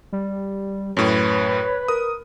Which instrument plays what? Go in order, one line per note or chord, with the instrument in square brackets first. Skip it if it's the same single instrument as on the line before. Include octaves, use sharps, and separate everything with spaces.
[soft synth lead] G3
[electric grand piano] F#2 A2 [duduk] B4 [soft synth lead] C#5
[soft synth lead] A#4 [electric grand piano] D#6